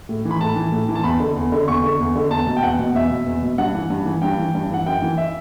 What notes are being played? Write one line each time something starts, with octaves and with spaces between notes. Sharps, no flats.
A2
E3
B5
A2 A5
E3
A2
E3
A5
E2 B5
D3
E2
D3
E2 C#6
D3
E2
D3
E2 A5
B2
G5
E2 F#5
B2
E2 E5
B2
E2
B2
G2 F#5
E3
G2
E3
G2 G5
E3
G2
E3 F#5
F#2 G5
E3
E5